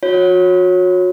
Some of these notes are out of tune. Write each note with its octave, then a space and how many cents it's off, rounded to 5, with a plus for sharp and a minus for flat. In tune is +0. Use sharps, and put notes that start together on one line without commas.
F#4 -35 C#5 -10